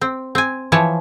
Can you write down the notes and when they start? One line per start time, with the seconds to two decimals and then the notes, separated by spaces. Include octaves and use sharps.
0.01 C4
0.35 C4 G#5
0.72 E3 F3 C#5 A5